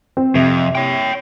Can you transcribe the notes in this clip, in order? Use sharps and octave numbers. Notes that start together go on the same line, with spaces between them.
C4
F2 C3
C#5 G5